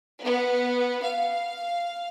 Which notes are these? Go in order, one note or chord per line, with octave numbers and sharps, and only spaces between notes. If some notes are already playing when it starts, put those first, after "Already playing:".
B3
F5